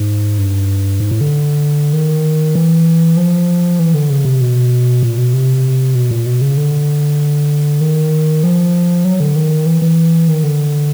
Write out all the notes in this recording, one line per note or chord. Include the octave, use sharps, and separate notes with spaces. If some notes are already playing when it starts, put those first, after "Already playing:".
Already playing: G#2
G2
G#2
A2
D3
D#3
E3
F3
E3
D3
C#3
C3
B2
A#2
B2
C3
B2
A#2
B2
C#3
D3
D#3
F3
F#3
D3
D#3
E3
E3
D#3
D3